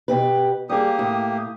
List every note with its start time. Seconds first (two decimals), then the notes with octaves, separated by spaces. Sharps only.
0.08 B2 G4 B4
0.70 G3 A#3 G4 G#4 D#6
0.99 A2